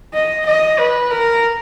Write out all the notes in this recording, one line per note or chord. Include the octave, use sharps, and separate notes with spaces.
D#5
D#5
B4
A#4